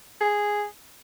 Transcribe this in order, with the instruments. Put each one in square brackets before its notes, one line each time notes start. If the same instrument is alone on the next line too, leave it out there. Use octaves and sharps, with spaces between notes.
[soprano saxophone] G#4